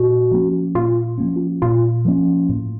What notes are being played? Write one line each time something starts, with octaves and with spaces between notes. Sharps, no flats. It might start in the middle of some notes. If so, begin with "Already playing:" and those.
Already playing: A#2 F#4
F3 A#3 C#4
A#2 F4
F3 A#3 C#4
A#2 F4
F3 A#3 C#4
A2